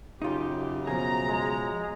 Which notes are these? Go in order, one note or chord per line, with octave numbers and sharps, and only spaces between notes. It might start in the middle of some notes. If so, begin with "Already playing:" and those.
F#2 C#3 D#4 F4 G4
B2 F3 G#4 A#5
G#3